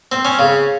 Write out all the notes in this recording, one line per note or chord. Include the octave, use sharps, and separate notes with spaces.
C4
C#4
C#3